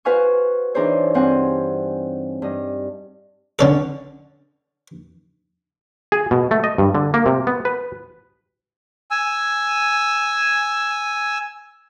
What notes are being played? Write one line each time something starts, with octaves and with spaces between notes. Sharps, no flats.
F#4 B4 C5 F5 G#5 C#6
E3 D4 D#4 G#4 C5 C#5
G2 C4 C5 F#5 G#5
G2 D#5
D3 C#4 A4
G#4
B2
A3
D#5
G2
D3
A#3
C3
B3
B4
G#5 E6